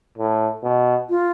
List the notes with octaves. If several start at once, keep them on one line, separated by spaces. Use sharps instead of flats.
A2
B2
F4